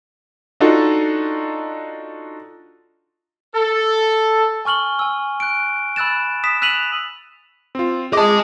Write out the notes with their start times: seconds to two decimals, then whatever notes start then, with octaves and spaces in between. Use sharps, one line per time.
0.60 D4 D#4 F4 F#4 A4 D#5
3.55 A4
4.65 G#5 C#6 F6 F#7 G7
4.99 G#5 E6
5.40 F#6 D7
5.96 B5 E6 F#6 A6 E7
6.44 D#6 B6 E7
6.62 E6 F#6 B6 D#7 F7 F#7
7.75 C4 F4
8.13 G#4 D#5 G#5 A5 D6